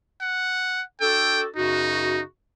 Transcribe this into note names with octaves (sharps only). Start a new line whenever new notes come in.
F#5
D4 F#4 A4 G5
F#2 C#3 D#4 F#4